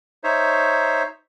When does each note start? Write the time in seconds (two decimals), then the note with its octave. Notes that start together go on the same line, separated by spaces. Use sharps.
0.24 D#4 C5 C#5 E5